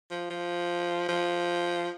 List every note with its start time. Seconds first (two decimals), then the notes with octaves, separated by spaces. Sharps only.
0.11 F3
0.30 F3
1.09 F3